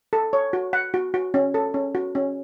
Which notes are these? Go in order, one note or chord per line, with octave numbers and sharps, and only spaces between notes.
A4
C#5
F#4
F#5
F#4
F#4
C#4
A4
C#4
F#4
C#4